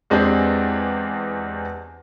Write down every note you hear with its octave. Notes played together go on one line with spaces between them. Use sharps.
E2 G#3 C4 D4 G4